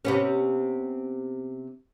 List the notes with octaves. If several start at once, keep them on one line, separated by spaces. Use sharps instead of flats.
C3 B3 C#4